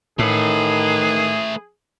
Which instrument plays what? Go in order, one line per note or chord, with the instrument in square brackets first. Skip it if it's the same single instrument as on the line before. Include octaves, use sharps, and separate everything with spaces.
[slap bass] A2 [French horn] D#3 [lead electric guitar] A3 B4 [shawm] G#4